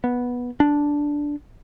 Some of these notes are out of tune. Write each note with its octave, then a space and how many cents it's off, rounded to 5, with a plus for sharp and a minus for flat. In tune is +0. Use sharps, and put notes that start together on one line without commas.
B3 -10
D4 -5